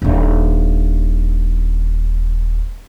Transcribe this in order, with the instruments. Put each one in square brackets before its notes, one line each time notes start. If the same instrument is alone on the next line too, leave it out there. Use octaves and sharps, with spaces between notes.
[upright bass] D#1 D4